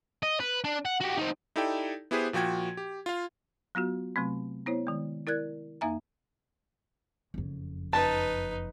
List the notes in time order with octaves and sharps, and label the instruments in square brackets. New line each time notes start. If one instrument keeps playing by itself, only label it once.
[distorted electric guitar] D#5
B4
D4
F#5
F#4 G4
C4 D#4
[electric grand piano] D#4 E4 G4 A4 D5 G5
B3 E4 G4 G#4 B4 C5
A#2 F3 F#4 G5 G#6
G4
F4 F5
[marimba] F#3 B3 F4 F#4
C3 F#3 A3 C4
B3 E4 C5 C#5
D#3 G#3
E4 A#4 D5 F#6 G#6
F2 A#3 D#4 E5 G#5 A#5
[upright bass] F#1 F2
[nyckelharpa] D#4 B4 [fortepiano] A5